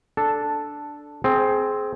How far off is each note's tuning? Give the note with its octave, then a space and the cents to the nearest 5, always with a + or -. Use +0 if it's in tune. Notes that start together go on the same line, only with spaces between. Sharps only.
D4 +0 A4 +0
C4 +0 G#4 +20